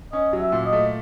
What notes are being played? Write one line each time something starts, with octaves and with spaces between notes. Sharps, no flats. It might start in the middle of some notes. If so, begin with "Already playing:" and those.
C#4 D#5
F#3
E5
A#2
D#5
A3